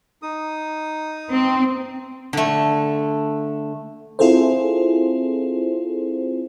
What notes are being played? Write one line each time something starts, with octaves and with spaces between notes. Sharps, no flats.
D#4 D#6
C4
D3 A3
C4 E4 F4 G#4 A4 C5